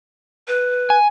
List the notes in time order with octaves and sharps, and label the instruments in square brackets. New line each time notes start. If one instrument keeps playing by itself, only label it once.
[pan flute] B4
[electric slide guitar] G#5